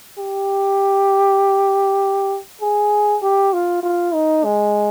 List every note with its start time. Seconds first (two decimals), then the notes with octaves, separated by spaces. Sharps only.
0.19 G4
2.62 G#4
3.23 G4
3.53 F4
3.83 F4
4.14 D#4
4.44 G#3